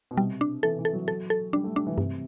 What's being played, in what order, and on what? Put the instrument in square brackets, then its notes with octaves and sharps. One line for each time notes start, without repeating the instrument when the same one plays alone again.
[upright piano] B2
[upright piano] C3 [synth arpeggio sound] G3
[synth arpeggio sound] D4
[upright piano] E3 [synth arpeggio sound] A4
[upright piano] E3
[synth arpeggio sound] A4
[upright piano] F#3
[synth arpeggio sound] A4
A4
[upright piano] G3 [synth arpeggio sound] D4
[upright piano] A3
[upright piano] G3 [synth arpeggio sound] D4
[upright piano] E3
[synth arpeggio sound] G2 [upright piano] C3